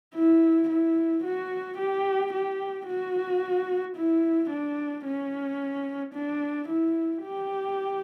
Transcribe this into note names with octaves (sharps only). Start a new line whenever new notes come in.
E4
E4
F#4
G4
G4
F#4
E4
D4
C#4
D4
E4
G4